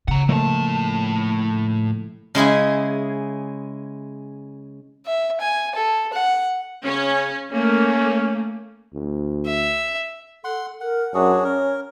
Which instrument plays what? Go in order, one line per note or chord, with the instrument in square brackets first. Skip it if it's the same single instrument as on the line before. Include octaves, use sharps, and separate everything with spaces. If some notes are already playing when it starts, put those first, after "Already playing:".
[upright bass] C#3 [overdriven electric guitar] F#5 A#5
[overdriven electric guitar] A2 A5 [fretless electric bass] F3 A3 A#3
[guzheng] C#3 G#3 E4 G#4
[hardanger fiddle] E5
G#5
A4
F#5
[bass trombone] C#3 [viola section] C#4
[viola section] A3 A#3 [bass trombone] C#4
[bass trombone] D2
[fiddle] E5
[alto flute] A4 [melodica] F#5 C6
[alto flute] A#4 [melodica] F#5
[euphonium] F#2 [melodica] D4 F#4 G#4 [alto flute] C#5
[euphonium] C#4 [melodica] A#4